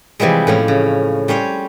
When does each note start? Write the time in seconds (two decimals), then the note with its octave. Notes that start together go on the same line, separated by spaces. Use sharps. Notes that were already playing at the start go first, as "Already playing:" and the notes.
0.20 C3 E3 F3 G3 G#3
0.47 A2 F3 C#4
0.68 C#3
1.28 G3 C#4 C5 C#5